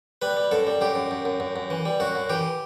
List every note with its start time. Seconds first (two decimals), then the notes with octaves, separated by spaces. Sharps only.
0.22 G3 B4
0.37 G3
0.51 F#2 A4
0.67 G3
0.81 F#2 G4
0.95 F#2
1.11 F#2
1.25 F#2
1.40 F#2
1.56 F#2
1.70 E3
1.85 G3
2.00 F#2 F#4
2.15 F#2
2.30 E3 G4